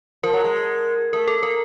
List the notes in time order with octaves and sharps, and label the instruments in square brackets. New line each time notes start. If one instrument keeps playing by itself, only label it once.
[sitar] F3 [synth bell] A#4
[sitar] F#3
G#3
[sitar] A3 [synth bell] A#4
[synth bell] A4
[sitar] A#3 [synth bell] A#4